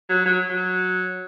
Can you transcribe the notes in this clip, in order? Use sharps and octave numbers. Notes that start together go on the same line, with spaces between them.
F#3
F#3
F#3